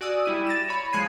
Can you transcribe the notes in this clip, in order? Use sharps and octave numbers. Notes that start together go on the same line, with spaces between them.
F#4 D5 G#5 D#6 E6 F#6
G3 E4 D#7
A6 A#6 D7 E7
C#5 B5 C#7
F3 G#3 F#6 G#6 C7 D#7